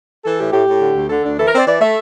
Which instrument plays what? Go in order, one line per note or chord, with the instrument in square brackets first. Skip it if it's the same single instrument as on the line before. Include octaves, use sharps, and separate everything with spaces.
[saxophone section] E3 A4
A2 G4
A2 G4
A2
D3
D2
D3 A4
D2 D4
E3 A4
A#4
C4 D5
E3 D5
A3 E5